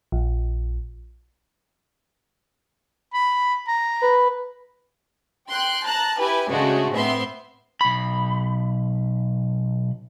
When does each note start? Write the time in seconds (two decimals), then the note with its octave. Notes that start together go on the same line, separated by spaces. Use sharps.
0.12 A#1
3.13 B5
3.68 A#5
4.01 B4
5.49 G5 C6 F#6
5.84 A5 A#5 F#6
6.18 E4 G4 B4 G#5
6.49 C#3 G#3 A3 D4 F#4
6.92 A2 B3 C4 E5 C6
7.81 B1 B5